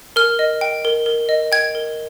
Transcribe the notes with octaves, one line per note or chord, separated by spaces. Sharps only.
A#4 F6
D#5
G5
A#4
A#4
D#5
G5 G#6
A#4